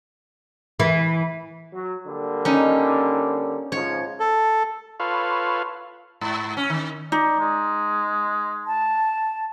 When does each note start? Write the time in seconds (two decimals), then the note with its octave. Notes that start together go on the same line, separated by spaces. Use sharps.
0.80 E3
1.74 F#3
2.07 D3 G3 A#3
2.45 C#4 D#4
3.72 G#2 C#3 F3 C#5
4.20 A4
5.00 F4 A4 B4 C#5 F5
6.21 G#2
6.57 C#4
6.70 D#3
7.12 D#4 D5
7.39 G#3
8.67 A5